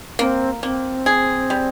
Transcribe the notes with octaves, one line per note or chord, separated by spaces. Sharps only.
A#3 C4
A#3 C4
G#4
G3